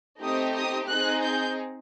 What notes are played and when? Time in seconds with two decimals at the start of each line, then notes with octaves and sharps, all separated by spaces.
0.21 A3 C4 D#4 G4 D#6
0.55 D#6
0.88 C4 D#4 G#4 F#6
1.22 G6